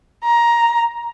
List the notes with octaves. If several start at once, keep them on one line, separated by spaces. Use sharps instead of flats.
A#5